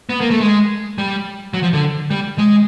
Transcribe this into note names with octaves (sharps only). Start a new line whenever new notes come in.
B3
A#3
A3
G#3
G3
F#3
F3
D3
G3
G#3